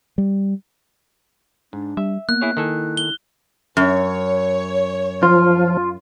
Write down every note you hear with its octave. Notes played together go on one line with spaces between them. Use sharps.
G3
G#2 D4
G3 E5
A#3 B3 F#6
E4 G#4 C#5
D#3 E4 A4 G#5
G7
F#2 C#5
F3 F4